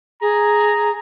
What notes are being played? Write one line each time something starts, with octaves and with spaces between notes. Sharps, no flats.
G#4 A#5